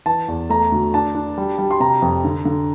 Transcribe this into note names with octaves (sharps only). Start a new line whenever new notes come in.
E3 A5
E2
A3 A#5
D2
D4 A5
D4
G3
G3
C6
C3 A#5
F2
D3
D3